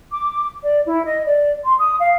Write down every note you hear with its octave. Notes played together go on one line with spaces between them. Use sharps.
D6
D5
E4
D#5
D5
C6
D#6
F5